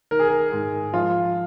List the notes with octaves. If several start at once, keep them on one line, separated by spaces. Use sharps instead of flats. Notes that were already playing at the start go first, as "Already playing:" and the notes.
D#3 A#4
G#4
A#4
G#2
F3 F4